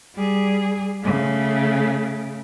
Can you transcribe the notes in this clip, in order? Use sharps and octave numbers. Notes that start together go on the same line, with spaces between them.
G3 G#4
C#3 A3